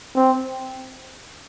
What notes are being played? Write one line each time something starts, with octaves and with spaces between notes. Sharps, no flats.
C4